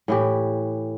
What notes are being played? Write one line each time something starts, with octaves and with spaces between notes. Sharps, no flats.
A2 E3 G4